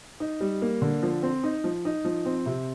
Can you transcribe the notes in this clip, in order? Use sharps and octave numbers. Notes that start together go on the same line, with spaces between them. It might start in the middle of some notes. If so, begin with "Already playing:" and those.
D#4
G3
A#3
D3
F3
C4
D#4
F3
D#4
F3
C4
C3